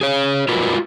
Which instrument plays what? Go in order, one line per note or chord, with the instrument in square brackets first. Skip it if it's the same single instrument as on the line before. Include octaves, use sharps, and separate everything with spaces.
[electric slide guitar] G#4 C#5
F4 F#4 A#4 B4